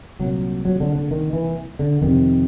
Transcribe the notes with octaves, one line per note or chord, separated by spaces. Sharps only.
C2 A#2 F#3
F#3
D3
D3
D#3
E3
D3
F2 C3 D#3